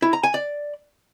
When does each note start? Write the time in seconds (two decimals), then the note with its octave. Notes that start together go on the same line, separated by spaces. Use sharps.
0.02 E4
0.13 A#5
0.23 G#5
0.34 D5